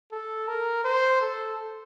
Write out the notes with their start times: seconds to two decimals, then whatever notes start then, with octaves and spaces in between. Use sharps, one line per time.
0.12 A4
0.48 A#4
0.84 C5
1.21 A4